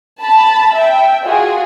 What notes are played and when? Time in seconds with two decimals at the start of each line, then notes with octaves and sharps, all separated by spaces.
0.21 A5 B5
0.74 E5 G5
1.24 F4 F#4 G#4